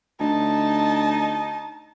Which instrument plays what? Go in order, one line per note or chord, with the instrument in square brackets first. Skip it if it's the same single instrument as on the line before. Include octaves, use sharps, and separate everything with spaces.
[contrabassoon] D2 [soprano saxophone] D#4 [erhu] A5